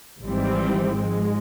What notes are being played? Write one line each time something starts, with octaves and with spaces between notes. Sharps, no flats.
G#1 G#2 E3 G3 C4
G#2 F3 G#3